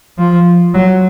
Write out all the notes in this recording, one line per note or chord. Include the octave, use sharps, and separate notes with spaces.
F3
F#3